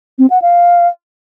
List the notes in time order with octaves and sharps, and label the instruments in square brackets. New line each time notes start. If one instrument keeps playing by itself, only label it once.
[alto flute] C4
F#5
F5